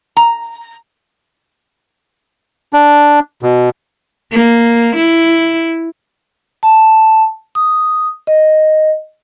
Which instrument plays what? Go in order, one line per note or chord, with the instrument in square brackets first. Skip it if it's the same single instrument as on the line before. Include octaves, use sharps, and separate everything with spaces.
[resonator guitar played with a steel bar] A#5
[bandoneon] D4
B2
[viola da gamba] A#3
E4
[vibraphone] A5
D#6
D#5